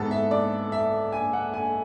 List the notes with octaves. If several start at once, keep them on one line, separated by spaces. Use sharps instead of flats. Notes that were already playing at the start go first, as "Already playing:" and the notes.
Already playing: G#2 G#3 B3 A4
E5
D5
E5
G#5
F#5
G#5